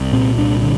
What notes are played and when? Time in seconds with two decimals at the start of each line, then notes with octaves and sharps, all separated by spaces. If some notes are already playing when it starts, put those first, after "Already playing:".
Already playing: C2
0.13 A#2 C4
0.38 C2 D4
0.63 D3